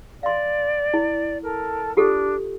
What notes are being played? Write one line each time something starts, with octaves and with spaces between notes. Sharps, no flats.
D5 F5 C6
E4
A4 A#4
D4 F4 G4 A4